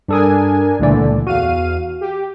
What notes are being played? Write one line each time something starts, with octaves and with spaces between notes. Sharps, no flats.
G2 D4 A4 A#4 G#5 D#6
C#2 A#2 D3 E3 A3 D5
E2 F#4 F5 D#7
G4